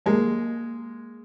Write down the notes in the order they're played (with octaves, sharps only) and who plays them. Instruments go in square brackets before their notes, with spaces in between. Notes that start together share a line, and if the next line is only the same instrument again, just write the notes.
[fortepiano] G#3 A#3